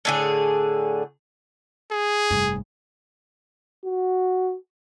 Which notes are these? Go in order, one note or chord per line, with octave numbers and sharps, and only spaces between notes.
A2 D3 G#4
G#4
F1 G2
F#4